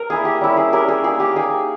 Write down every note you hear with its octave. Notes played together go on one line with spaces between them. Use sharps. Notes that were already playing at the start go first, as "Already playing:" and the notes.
Already playing: A#4
A#3 E4 G#4
G4
G3 C#4 E4
G#4
G3 C#4 E4 G4 A#4
G#4
A#3 D#4 G#4
G4
A#3 D#4 G#4